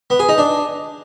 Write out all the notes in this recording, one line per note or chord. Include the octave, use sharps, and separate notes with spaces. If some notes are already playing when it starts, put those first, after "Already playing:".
B3
G#4
D#4
D4